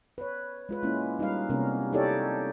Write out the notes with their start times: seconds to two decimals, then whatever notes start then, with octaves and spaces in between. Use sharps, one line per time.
0.18 B4 C#5
0.69 G#3 F4 B4
0.83 G#3 A#3 C#4 E4
1.19 G3 D#4 F4 B4 F5
1.50 C3 A#3 B3 C#4 A#4
1.93 D#4 E4 G4 A4 C#5 D5